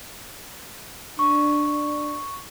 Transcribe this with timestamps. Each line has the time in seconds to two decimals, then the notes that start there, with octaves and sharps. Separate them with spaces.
1.19 D4 C#6